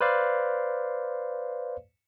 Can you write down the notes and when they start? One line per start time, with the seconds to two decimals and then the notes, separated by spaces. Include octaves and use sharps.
0.01 B4 C5 D5 F5